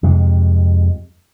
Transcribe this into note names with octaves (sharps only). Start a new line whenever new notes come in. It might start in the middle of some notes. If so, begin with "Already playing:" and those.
F2 C3 G#3